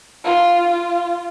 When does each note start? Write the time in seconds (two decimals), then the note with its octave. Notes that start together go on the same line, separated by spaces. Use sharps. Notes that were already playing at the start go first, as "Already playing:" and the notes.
0.24 F4
0.68 F4